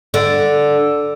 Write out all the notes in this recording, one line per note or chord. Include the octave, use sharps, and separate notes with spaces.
D3